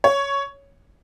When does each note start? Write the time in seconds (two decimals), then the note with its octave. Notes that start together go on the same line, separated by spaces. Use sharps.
0.04 C#5